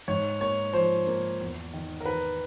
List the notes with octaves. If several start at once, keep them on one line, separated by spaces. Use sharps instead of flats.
G#2 C#5
A#3 C#5
F3 C5
A#3
E2
D#3
A#4
D#3 B4